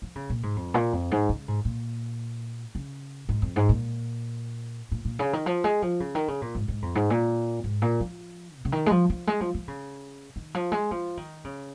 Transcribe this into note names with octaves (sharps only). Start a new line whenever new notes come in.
F3
C#3
A#2
G#2
F2
A#2
F2
G#2
C#3
G#2
A#2
C#3
G#2
F2
G#2
A#2
A#2
A#2
C#3
D#3
F3
G#3
F3
C#3
D#3
C#3
A#2
G#2
G#2
F2
G#2
A#2
G#2
A#2
F3
A#2
C#3
D#3
G#3
F3
F3
G#3
F3
F3
C#3
D#3
F3
G#3
F3
D#3
C#3